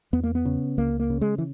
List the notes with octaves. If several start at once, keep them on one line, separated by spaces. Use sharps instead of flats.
E2 B3
A#3
B3
C#3
C#2 A#3
A#3
C#3
G#3
E3